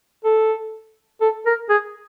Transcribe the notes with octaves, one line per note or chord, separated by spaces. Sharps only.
A4
A4
A#4
G#4